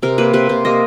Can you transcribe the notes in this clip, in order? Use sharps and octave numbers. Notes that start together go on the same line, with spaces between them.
C3 A#4
A#3 B4
C3 B4
C3 C5
A#3 D#5